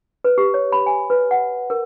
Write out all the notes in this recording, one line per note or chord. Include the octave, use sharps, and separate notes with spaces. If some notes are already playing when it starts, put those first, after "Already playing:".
B4
G4
C#5
B5
G#5
B4
F#5
A#4